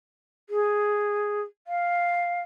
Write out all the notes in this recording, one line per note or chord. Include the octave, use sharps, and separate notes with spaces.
G#4
F5